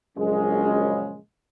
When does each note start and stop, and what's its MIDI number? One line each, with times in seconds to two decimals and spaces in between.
0.17 1.16 34
0.17 1.16 42
0.17 1.16 49
0.17 1.16 56